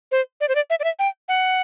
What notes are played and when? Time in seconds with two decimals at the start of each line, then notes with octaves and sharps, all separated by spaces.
0.12 C5
0.41 D5
0.49 C5
0.55 D5
0.70 E5
0.80 D5
0.84 E5
0.99 G5
1.29 F#5